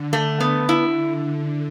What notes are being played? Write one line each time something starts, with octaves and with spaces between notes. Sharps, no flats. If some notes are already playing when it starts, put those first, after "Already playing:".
Already playing: D3
A3
D3 B3
E4